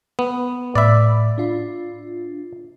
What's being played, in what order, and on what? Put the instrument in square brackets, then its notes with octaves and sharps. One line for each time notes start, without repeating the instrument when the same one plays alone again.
[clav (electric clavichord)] B3
[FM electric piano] A2 B5 [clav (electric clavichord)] D5 E5
[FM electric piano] D4 F4